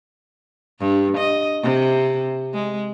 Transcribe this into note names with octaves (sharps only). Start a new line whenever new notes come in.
G2
D#5
C3
G#3